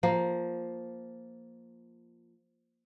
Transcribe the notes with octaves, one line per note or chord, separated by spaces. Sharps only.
F3 A#3